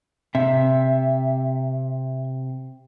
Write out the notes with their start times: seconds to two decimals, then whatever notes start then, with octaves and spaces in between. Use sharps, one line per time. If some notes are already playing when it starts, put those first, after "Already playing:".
0.35 C3 E5